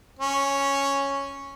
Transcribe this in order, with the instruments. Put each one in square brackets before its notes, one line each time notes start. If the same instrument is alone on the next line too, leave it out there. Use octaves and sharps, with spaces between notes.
[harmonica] C#4